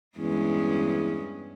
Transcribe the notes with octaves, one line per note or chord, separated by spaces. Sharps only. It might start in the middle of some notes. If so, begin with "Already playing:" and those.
E2 G2 G#3 C#4